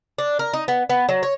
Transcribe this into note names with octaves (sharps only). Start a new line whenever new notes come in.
D4
A#4
D#4
B3
B3
F#3
C#5